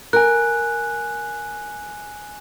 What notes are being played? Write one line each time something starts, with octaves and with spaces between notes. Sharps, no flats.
A#4 G#5 F#6